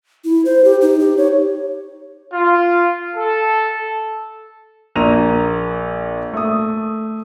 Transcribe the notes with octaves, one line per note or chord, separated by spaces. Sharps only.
E4
C5
G4
D#4
G4
C#5
F4
A4
A#1 A#3 A#5 D#7 F7
A3 D#6